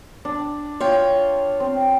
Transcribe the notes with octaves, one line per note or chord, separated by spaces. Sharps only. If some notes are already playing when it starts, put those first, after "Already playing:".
D4
F4 C#5 G5
C4